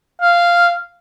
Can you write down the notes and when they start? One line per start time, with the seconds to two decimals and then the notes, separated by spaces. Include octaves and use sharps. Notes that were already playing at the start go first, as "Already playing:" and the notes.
0.22 F5